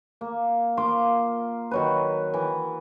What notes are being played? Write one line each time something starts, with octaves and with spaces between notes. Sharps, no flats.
A#3
A#3 F4 C6 D6
D#3 F#3 B4
E3